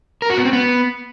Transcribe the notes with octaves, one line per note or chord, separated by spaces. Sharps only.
A#4
F#4
B3
C4
B3